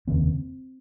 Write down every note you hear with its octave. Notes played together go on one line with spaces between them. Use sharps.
F1 D#2 C#3 C4